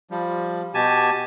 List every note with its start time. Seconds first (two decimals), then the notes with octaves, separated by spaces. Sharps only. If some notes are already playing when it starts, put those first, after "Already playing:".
0.11 F3 G3
0.74 B2 G4 G#5 A5